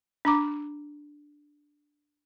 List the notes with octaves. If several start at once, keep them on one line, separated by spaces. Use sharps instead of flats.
D4 A#5 D6